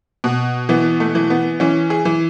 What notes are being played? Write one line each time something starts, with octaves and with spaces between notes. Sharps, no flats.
B2
E3 B3
A3
E3
B3
E3 C#4
G#4
E3